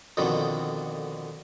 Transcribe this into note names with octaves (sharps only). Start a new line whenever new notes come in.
F2 B2 D3 D#3